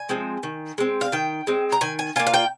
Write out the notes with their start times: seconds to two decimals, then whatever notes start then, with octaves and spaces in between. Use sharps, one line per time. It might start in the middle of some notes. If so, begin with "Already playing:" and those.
Already playing: G#5
0.09 F3 G#3 C4
0.43 D#3
0.78 G#3 C4
1.01 F5
1.12 D#3 G5
1.47 G#3 C4
1.72 A#5
1.81 D#3 G#5
1.99 G#5
2.16 A#3 F4 G#5
2.27 F5
2.34 G5